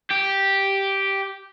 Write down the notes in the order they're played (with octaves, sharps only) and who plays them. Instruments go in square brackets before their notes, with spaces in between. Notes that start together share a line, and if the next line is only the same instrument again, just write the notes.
[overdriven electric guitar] G4